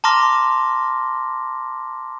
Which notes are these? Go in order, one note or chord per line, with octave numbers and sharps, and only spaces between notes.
A5 A#5 C6 D6 F6 A#6